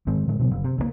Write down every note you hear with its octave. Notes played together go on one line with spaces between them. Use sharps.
G#2 D#3 G#3 C4
A2 D3 G#3
B2 D3 F#3 B3
F#1
C3
C#2 C#3 A#3